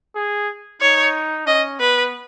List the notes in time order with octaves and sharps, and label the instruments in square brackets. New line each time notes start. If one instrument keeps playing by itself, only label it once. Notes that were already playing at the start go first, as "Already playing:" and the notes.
[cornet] G#4
[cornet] D#4 [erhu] C#5
[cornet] C#4 [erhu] D#5
[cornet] B3 [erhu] B4